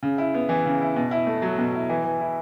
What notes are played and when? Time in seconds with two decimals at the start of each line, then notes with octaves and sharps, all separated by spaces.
0.03 C#3
0.18 E4
0.34 B3
0.49 E3
0.66 C#3
0.81 E4
0.96 B2
1.11 E4
1.26 A3
1.42 F#3
1.58 B2
1.74 E4
1.89 E3
2.04 E3
2.20 E4